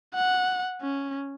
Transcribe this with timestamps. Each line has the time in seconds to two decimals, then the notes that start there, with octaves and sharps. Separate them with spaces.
0.15 F#5
0.81 C#4